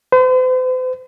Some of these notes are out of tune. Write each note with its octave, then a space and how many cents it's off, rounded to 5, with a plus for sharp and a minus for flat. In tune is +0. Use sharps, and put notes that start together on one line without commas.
C5 -45